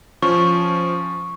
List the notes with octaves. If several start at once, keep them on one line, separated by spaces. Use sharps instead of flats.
F3 C#4 C#6